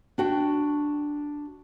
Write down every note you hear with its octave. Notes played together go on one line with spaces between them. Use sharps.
D4 F#4 G5